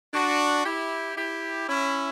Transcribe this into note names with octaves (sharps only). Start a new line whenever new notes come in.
D4 F#4
E4 G4
E4 G4
C#4 E4